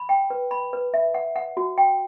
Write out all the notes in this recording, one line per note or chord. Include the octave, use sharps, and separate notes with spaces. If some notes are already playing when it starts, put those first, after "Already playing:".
Already playing: B5
G5
B4
B5
B4
E5
F#5
F#5
F#4
G5